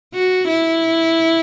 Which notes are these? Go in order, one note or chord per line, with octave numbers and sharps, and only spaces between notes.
F#4
E4